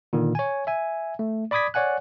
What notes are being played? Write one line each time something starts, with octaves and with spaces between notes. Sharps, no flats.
A#2 D3 D#3
C#5 G#5
E5 G#5
A3
D5 B5 D6 D#6 G#6 B6
C#5 D5 F#5 G#5 F#6